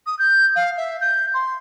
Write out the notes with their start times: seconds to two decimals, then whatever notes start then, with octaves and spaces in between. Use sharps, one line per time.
0.06 D#6
0.19 G6
0.55 F5
0.77 E5
1.01 G6
1.34 C6